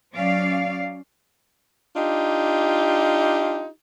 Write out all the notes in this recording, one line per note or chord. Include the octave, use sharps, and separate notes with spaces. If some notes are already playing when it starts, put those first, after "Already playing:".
F#3 C#4 D5 F5
D4 D#4 F4 G4